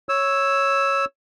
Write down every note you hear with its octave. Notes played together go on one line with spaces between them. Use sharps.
C#5 E6